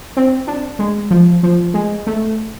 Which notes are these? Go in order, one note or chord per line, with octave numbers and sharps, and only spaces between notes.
C4
D4
G#3
F3
F3
G#3
A3